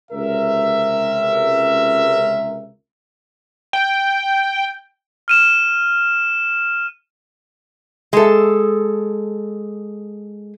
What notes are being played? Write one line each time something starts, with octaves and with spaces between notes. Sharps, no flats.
C#2 C3 A#4 E5
G5
F6 D#7 E7
G#3 A4